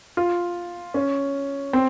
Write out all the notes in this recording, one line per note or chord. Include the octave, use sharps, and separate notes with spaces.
F4
C#4
C4